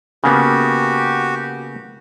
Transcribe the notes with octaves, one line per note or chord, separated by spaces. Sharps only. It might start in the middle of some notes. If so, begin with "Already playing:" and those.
C#3 A#3 B3 F#4 G4